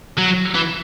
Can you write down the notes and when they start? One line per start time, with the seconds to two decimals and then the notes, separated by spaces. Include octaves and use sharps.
0.18 F#3
0.55 E3